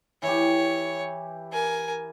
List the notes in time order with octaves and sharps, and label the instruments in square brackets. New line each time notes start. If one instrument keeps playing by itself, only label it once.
[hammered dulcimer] E3 G4 [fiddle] C#5
[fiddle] A#4 G#5